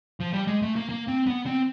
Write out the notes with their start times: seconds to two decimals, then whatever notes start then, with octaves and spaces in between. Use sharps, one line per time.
0.20 F3
0.33 G3
0.47 G#3
0.62 A3
0.76 A#3
0.89 A#3
1.08 C4
1.27 B3
1.46 C4